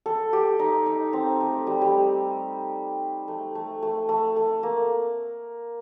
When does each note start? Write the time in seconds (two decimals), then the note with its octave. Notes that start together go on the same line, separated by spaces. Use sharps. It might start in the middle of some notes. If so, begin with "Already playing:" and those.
0.06 A4
0.33 G4
0.59 D#4
0.86 D#4
1.13 C4
1.40 A3
1.67 G3
1.82 G3
3.28 A3
3.55 A3
3.82 A3
4.09 A3
4.36 A3
4.63 A#3